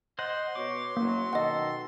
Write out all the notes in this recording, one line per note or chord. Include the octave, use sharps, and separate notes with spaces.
C5 D#5 F#5 C6
B2 C#5 D6
F#1 F#3 A#3
B2 D#3 A4 D#5 F#5